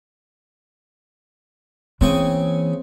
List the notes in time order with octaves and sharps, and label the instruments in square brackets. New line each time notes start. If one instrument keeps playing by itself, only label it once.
[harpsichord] C#3 G#4 C#6 [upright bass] E3 A#3 [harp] C4